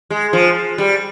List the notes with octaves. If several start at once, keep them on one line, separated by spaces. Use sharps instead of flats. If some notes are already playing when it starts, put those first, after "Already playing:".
G#3
F3
G3